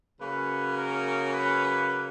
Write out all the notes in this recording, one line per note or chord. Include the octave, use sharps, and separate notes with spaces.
C#3 F#3 A#3 C#4 B4
A#4
B4